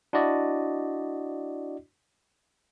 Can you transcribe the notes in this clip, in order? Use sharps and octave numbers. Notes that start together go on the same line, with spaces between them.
D4 E4 F#4 D5 D#5